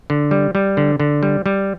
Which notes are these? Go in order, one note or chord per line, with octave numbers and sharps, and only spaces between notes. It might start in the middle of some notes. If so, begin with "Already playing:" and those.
D3
G3
G3
D3
D3
G3
G3